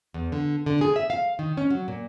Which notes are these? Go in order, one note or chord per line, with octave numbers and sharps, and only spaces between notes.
E2
D3
D3
G#4
E5
F5
D#3
C#4
F#3
A#2